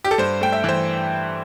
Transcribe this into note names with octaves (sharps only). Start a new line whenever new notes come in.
G4
A4
G2 C5
A3 G5
E5
E3 C5